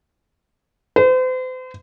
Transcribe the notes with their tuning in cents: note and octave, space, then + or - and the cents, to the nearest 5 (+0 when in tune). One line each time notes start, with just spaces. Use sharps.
C5 -40